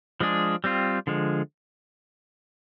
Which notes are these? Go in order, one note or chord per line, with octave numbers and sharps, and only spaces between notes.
F3 G#3 D4 G#4
G3 C4 F4
D3 F3 G#3